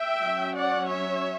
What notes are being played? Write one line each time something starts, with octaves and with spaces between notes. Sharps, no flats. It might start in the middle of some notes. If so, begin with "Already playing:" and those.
Already playing: E5 G5
F#3 C#4
D5 F#5
C#5 E5